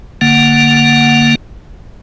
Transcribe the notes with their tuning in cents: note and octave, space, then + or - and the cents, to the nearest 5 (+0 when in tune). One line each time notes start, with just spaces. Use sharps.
D3 +0 A#3 +0 F#5 +0